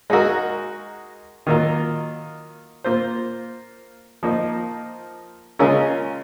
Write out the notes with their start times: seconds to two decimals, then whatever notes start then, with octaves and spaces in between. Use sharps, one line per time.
0.10 G#3 D#4 F#4 A#4
1.47 D#3 F#3 A#3 F4 A#4
2.84 A#3 F4 C5
4.23 F3 A#3 D#4
5.59 C#3 G#3 C#4 F4 A#4